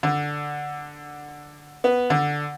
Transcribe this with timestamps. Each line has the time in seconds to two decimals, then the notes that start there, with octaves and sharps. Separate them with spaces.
0.03 D3
1.84 B3
2.10 D3